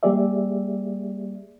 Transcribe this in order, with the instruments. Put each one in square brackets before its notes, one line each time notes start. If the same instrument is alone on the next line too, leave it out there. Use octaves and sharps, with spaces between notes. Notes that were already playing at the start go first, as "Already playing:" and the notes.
[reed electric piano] G3 A#3 G4 G#4 D5 E5